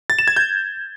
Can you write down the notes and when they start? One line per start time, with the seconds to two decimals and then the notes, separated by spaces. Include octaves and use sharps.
0.10 A6
0.19 E7
0.28 G#6
0.36 G6